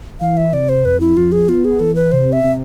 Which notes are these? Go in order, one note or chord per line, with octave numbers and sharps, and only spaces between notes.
E3 F5
E5
C3 D5
C5
F2 B4
E4
F2 F4
G#4
B3 F4
G#4
E3 A4
B4
C3 C5
E5
C3